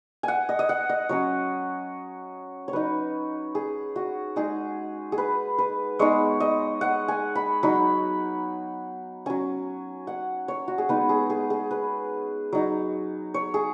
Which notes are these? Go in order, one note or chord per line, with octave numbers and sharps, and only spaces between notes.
F#5 G#5
D#5
D#5
F#5
D#5
F#3 C#4 C#5
C#5
F#3 D#4 B4
G#4
F#4
G#3 D#4 G#4
G#4
B4
B4
G#3 B3 D#4 C#5
D#5
F#5
G#5
B5
F#3 D#4 B5
F#3 C#4 G#5
F#5
C#5
F#4
G#4
G#3 B3 D#4 B4
G#4
G#4
G#4
B4
F#3 D#4
C#5
G#4